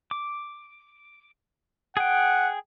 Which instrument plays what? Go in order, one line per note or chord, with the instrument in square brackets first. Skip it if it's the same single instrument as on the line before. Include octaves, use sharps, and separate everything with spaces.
[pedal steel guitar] D6
[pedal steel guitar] G#4 G5 [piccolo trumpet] F#5